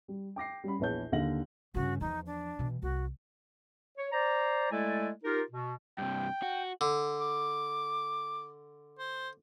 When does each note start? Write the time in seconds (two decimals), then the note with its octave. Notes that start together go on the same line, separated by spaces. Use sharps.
0.08 G3
0.36 G5 D6 A#6 C7
0.64 G3 C#4 B5
0.79 A#1 E2 B4 C#5 A5 G6
1.12 D#2 D3 F5 A#6 F#7
1.74 G2 C#3 F#4
2.01 E2 F3 D#4
2.26 D4
2.59 B2 E3
2.82 C2 F#4
3.98 C#5
4.12 C5 D5 A#5
4.72 G#3 A3 E4 A4 D5 G#5
5.25 D#4 F4 G4 A#4
5.51 B2
5.98 G2 C3 G5
6.42 F#4
6.81 D3
7.21 D6
8.99 C5